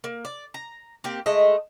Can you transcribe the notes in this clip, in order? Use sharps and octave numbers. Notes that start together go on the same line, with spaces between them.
A#3
D5
A#5
A#3 C4 G4
G#3 A3 D#5